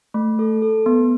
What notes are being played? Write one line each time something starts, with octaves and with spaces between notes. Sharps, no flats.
A3
A4
A4
B3